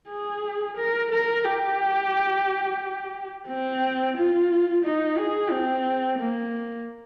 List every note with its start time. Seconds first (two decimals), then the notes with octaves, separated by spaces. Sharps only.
0.09 G#4
0.77 A#4
1.11 A#4
1.45 G4
3.48 C4
4.16 F4
4.84 D#4
5.18 G#4
5.51 C4
6.19 A#3